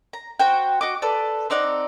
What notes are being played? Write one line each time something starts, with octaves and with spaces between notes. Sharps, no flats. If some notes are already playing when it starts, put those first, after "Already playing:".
A#5
F#4 C5 F#5 G5
F#4 D#5 D6
A4 B4 D5
C4 D#4 D5 F#5